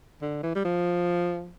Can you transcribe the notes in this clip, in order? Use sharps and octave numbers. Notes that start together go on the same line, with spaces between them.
D3
E3
G3
F3